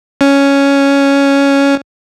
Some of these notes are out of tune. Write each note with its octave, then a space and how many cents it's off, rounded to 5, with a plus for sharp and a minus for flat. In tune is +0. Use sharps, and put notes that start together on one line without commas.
C#4 +5